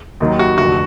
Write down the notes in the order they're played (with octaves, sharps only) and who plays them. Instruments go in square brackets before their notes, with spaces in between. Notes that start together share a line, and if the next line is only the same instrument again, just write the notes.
[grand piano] D#2 D#3 F#3
F#4
F1 F2 D3 F#4